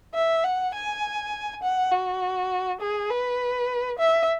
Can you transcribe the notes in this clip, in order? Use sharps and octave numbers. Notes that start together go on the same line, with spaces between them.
E5
F#5
G#5
F#5
F#4
G#4
B4
E5